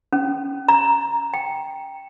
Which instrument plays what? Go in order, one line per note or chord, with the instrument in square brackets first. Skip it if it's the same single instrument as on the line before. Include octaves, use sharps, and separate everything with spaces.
[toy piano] C#4
A#5
G5